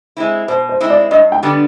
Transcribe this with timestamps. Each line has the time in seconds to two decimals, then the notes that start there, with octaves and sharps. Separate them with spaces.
0.17 G#3 C4 E4
0.48 B2 C5
0.69 C5
0.80 G#3 C4 E4
0.90 D5
1.11 G2 D#5
1.32 G5
1.43 D3 G3 B3 D4